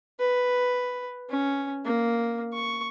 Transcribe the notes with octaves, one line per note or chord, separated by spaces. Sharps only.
B4
C#4
A#3
C#6